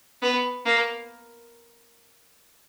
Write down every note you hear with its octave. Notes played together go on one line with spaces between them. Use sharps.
B3
A#3